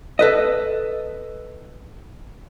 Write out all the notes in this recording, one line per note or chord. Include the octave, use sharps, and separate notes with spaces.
A4 B4 D#5